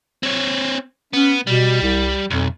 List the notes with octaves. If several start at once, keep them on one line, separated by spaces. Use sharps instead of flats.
C4 C#5
B3 C#4
B2 G3
C2
B1 F2